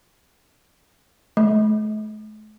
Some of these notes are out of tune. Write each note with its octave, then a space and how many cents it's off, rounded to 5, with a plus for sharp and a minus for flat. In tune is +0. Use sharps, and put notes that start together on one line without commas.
A3 -40